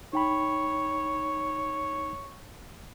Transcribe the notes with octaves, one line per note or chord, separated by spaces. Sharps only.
D#4 C#5 G5 B5